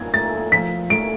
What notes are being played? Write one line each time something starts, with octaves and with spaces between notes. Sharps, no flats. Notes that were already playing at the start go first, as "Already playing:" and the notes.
Already playing: G#6
A3 A6
F3 B6
A3 D7